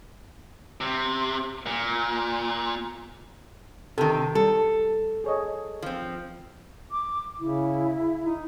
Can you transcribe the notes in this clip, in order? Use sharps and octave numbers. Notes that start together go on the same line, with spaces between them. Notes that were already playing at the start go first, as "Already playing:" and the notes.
C3
A#2
C3 D#3 A4
G3 A4
G#4 C#5 D#5
F3 C4
D6
C#3 E4
D#4